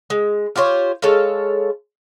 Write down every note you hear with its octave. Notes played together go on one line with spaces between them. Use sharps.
G#3
F4 G4 C5 C#5
G#3 A4 C#5 F5